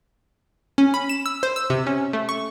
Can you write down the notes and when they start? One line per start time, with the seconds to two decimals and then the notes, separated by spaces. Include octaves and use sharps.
0.78 C#4
0.94 B5
1.09 E7
1.26 E6
1.43 C5
1.56 E6
1.70 C3
1.87 C#4
2.13 A3
2.29 C#6